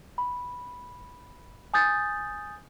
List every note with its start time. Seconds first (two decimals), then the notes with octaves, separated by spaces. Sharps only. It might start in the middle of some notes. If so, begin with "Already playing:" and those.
0.18 B5
1.74 G#5 D#6 G6 A6